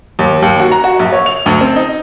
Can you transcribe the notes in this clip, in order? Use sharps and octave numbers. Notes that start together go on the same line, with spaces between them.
D#2
D#2
F#4
A#5
F#4
A#1
C#5
F7
D2
C4
D#4